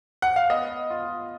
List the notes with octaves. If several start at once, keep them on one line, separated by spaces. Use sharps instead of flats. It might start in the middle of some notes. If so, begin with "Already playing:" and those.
F#5
F5
B3 D#5
F4